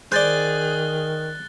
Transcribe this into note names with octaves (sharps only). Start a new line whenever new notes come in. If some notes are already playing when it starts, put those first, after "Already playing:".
D#3 G#4 C5 D5 F#6 A6 G7